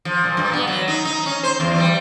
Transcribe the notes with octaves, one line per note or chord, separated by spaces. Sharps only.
F3
A#2
G2
B3
F#3
D#4
D#4
C#4
C5
E2
G3